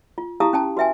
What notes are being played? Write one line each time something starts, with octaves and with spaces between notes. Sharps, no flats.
F4
E4 G4 F5 A5 A#5 D#6
C#4 G5 A5
F#4 B4 E5 G5 G#5